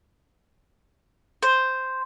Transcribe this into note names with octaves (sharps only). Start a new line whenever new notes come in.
C5